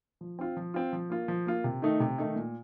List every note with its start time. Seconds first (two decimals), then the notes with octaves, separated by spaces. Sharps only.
0.21 F3
0.39 C4 F4
0.56 F3
0.74 C4 F4
0.93 F3
1.10 A#3 F4
1.28 F3
1.46 A#3 F4
1.64 C3
1.82 D#3 A3 D#4
2.00 C3
2.18 D#3 A3 D#4
2.36 A#2